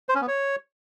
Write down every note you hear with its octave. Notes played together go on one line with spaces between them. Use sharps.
C5
C#4
B3
C#5